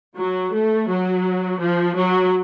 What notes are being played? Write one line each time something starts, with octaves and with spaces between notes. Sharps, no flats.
F#3
A3
F#3
F3
F#3